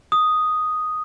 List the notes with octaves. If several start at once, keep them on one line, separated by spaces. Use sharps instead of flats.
D#6